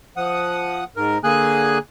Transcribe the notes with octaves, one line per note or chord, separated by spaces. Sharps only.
F3 F#5 D#6
G#2 A#4
D3 A#3 G#4 G#5 F#6